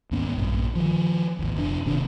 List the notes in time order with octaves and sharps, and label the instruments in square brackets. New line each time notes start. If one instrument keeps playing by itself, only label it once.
[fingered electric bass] D#2 G#2 B3 C#4
A#1 G2
D#3 F3
G#1 D#2
F1 D4
D#1 D#2 C3 D4